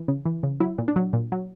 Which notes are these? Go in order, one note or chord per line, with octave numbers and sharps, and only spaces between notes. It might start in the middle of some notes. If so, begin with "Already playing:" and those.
Already playing: E3
C#3
E3
C#3
F#3 E4
A#2
D4
F#3
A#2
F#3